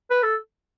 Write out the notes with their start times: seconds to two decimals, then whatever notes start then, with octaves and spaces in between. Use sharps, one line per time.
0.11 B4
0.23 A4